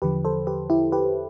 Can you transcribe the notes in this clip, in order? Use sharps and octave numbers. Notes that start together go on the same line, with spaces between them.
E2 D3 F3 G4 B4
A4 C5
G4 B4
E4 G4
G4 B4